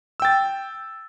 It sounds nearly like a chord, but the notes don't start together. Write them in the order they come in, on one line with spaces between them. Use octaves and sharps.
E6 G5 A6